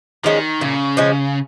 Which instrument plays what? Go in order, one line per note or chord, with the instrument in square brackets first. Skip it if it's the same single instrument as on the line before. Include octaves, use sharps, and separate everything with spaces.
[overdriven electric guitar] D#3 [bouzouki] F3 G#3 C#4
[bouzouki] A#2 [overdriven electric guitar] C#3
[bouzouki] F3 G#3 C#4